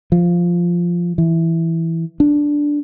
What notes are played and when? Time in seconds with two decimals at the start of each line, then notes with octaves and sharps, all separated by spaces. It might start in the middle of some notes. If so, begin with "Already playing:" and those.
0.12 F3
1.18 E3
2.20 D4